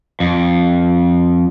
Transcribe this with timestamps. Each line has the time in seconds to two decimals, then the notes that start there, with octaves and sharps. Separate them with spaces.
0.20 F2